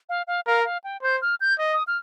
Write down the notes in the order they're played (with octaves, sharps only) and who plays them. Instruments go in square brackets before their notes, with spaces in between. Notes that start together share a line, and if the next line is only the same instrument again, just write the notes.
[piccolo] F5
F5
[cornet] A#4 [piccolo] F5
[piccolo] F5
G5
[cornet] C5 [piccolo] G6
[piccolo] F6
G6
[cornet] D#5
[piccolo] D#6
F6